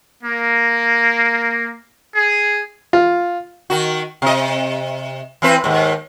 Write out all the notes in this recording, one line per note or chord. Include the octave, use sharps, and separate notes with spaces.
A#3
G#4
F4
D#3 F#4
C3 D#5
E3 C4 B4
D#2 G#2